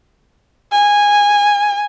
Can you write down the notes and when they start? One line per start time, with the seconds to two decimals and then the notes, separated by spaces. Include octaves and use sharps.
0.72 G#5